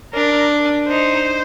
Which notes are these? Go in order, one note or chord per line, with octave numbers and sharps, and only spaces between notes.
D4 A#4
D#4 C5